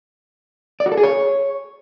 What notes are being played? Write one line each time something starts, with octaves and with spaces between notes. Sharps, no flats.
D5
F#4
A4
G#4
C#5